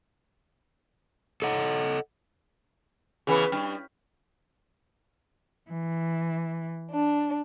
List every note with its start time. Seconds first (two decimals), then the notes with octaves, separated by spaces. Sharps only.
1.42 A4 D#5 F#5
3.27 C#3 E3 B3 G#4 B4 B5
3.52 G2 F6
5.71 E3
6.92 D4